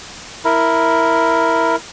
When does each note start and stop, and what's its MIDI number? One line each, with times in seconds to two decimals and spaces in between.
0.45 1.76 64
0.45 1.76 70